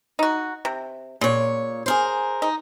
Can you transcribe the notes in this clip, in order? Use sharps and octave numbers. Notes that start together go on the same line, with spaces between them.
D#4 F#4
C3
A#2 C#3 C#5
G#4 A#4 C5
D#4